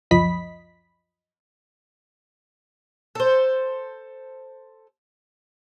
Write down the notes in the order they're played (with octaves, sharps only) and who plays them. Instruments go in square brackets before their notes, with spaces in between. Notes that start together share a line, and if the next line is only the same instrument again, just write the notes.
[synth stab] C#2 F#2 F3 D#5 B5 B6
[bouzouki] A4 C5